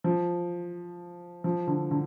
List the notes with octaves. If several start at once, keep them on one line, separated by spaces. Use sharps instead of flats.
F3
F3
D3
D3